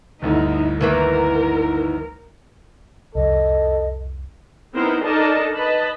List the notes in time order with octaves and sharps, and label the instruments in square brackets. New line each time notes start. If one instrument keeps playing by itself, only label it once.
[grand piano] G1 D2 A4 [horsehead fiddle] D#4 E4
[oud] D#3 E3 A#3 [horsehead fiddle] A#4
[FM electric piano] C2 F2 [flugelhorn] A4 [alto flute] D#5
[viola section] B3 C4 D#4 E4 A#4 C5
D4 D#4 A4 A#4 D#5 A5
B4 D#5 A5 B5